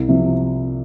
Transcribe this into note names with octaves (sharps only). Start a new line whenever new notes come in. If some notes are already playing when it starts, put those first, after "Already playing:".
Already playing: C2
C3 F3